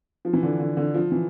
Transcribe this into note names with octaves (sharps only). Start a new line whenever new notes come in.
F3
E3
D3
D3
D3
F3
E3